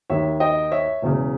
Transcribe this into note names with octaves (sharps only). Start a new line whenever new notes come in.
D#2 D#3 C#5 E5
D#5 G5
C#5 E5
E1 E2 C#3